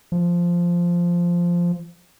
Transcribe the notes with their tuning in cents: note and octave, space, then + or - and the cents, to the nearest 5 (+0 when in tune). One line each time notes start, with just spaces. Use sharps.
F3 -5